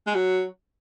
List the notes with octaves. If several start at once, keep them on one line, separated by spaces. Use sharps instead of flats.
G#3
F#3